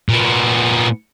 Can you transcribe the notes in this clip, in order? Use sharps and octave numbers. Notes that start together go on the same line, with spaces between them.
A#2 B3